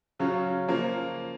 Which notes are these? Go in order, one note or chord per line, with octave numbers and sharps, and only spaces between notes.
C#3 F#3 C#4 F4
C#3 F3 A#3